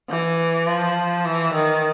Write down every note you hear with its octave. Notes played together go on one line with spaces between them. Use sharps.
E3
F3
E3
D#3